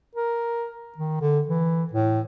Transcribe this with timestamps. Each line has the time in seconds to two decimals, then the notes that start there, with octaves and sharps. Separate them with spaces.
0.15 A#4
0.98 D#3
1.21 D3
1.47 E3
1.93 A2